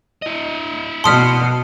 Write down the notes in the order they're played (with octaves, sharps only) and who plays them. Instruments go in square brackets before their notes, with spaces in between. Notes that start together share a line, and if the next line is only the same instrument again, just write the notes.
[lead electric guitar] E4 D#5
[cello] B2 [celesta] A5 B6 [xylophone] C6 D#6 F6